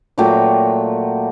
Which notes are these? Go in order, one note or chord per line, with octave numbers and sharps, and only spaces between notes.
A#2 F#3 A3 G5